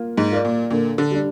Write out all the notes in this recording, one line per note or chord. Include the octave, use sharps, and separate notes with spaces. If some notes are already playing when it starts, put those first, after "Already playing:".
Already playing: A#3 F4
G#2
F4 A#4 D5
A#2
A#2 D3
D3
G3 D4